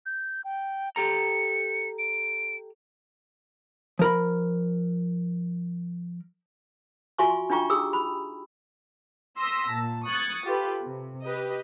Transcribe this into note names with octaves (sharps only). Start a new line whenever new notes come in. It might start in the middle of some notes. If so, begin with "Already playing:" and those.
G6
G5
G4 A4 A#5 C#7
D7
F3 A#4 B5
F4 F#4 E5 G#5 C6 C#6
D4 D#4 F4 G5 A#5 C#6
G4 G#4 D#6 E6
B5
C6 D#6 E6 A#6 B6
A#2 A5
C#6 D#6 F#6 G#6 A6 C#7
F4 G4 A4 B4
C3
G4 B4 D#5